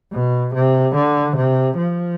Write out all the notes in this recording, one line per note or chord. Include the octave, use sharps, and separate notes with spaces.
B2
C3
D3
C3
F3